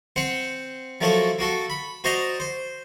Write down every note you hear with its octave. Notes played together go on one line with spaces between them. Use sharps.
C4 C5 F#5
F3 F#3 A3 A#3 F#4 A4
A#3 F#4 A4
B5
F#4 C5 D5 D#5 A#5
C5